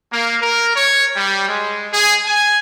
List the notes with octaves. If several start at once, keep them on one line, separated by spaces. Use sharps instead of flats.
A#3
A#4
C#5
G3
G#3
G#4
G#5